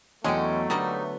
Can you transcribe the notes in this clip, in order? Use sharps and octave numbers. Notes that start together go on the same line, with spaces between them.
E2 D3 F#3 G#3 A3 C#4 D#5 G5
D3 G3 A#3 B3 D#4